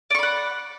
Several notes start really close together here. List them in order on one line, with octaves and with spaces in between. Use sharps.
D5 C#6 B5 F#5